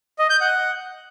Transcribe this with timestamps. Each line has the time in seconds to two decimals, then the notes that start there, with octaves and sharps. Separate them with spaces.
0.19 D#5
0.30 G6
0.41 F#5